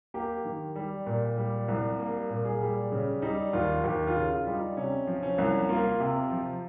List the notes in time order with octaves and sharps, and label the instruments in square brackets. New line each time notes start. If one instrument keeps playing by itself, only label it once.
[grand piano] A#3 G4
D#3
G3
A#2
G3
C2
A#3
A#2
G#4
G3
C#3
G3 D#4
D#2 F4
D#2 G4
F4
C#3
F4
G3 F4
D#4
C3 C#4
F3
C#4
C2
A#3 F4
C3
F3